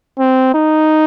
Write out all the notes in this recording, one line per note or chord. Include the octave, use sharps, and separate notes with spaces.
C4
D#4